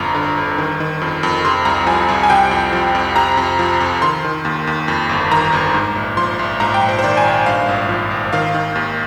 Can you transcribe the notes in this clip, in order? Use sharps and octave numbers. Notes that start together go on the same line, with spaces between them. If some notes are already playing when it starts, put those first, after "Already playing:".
Already playing: G1 F2 A#5
D3
G1
D#3
D#3
F2
F2
C3 C6
C2 A#5
F3 G#5
C2
G#5
C3 G5
F2
F3
F2
C3 A#5
F2
F3
F2
D#3 C6
D#3
D#2
D#2
F2
G1
D#3 A#5
G1
G#2
A#1
F3 C6
A#1
G#2 A#5
G5
A#1
C5
C5
D#3 D5
G#5
A#1
G2 F5
G#1
F3
G#1
D#3 F5
D#3
D#2